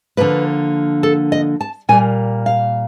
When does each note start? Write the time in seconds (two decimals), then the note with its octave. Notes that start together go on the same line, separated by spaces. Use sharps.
0.17 D3 F3 A#3 B4
1.03 A4
1.32 D#5
1.61 A5
1.89 A#2 G3 A#3 G#5
2.46 F5